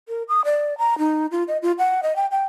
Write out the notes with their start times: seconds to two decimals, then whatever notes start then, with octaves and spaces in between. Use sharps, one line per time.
0.08 A#4
0.28 D#6
0.45 D5
0.78 A#5
0.98 D#4
1.32 F4
1.48 D#5
1.62 F4
1.79 F#5
2.03 D#5
2.16 G5
2.32 G5